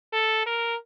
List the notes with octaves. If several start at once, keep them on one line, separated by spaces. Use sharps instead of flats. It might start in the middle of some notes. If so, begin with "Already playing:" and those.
A4
A#4